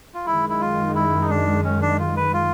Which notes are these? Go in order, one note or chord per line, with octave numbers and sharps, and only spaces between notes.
F4
F#2 D#3 G#3 E4
E4
F4
E4
D#4
D4
C#4
D4
F4
B4
F4